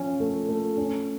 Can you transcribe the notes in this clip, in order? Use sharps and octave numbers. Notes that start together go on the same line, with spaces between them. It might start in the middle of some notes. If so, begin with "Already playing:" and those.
Already playing: F3 C#4
A3
A3
C#4